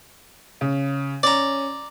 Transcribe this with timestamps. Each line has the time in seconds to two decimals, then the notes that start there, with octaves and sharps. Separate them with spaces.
0.61 C#3
1.23 C#4 D5 A#5